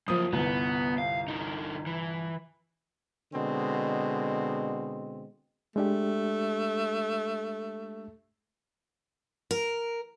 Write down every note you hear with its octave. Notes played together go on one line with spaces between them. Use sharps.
F#2 F3 A#3 D#6
G1 C2 B3
F5
D3 D#4
E3
B2 D3 G#3 C4
G#3 A3 D4 G4
A#4